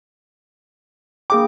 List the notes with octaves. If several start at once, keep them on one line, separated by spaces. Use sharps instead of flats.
A#3 G#4 G5 D6